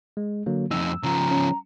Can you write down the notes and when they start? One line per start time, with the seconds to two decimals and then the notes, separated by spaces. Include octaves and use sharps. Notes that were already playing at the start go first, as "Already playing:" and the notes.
0.17 G#3
0.46 D3 F#3 A#3
0.71 F2 D#4 E6
1.04 C#3 F3 A#5
1.31 C#4